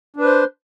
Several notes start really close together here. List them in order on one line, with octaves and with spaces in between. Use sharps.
D4 B4 C5